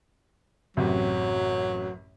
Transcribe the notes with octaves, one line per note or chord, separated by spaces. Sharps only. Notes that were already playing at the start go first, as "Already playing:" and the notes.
A1 F#2 C3 F#3